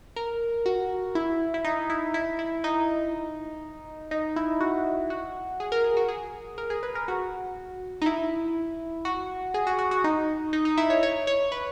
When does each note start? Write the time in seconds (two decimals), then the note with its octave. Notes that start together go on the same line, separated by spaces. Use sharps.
0.16 A#4
0.66 F#4
1.15 E4
1.54 E4
1.65 D#4
1.90 E4
2.14 E4
2.39 E4
2.64 D#4
4.11 D#4
4.36 E4
4.60 F#4
5.10 F#4
5.60 G#4
5.72 A#4
5.84 G#4
5.97 F#4
6.08 G#4
6.58 A#4
6.70 G#4
6.83 B4
6.95 A#4
7.08 F#4
8.02 D#4
8.06 E4
9.05 F#4
9.54 G#4
9.67 F#4
9.79 F#4
9.91 F#4
10.04 D#4
10.53 D#4
10.65 D#4
10.77 E4
10.90 C#5
11.03 C#5
11.27 C#5
11.52 B4